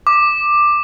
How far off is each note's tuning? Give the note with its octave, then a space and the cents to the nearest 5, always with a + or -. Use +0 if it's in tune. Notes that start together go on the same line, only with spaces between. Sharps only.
D6 +10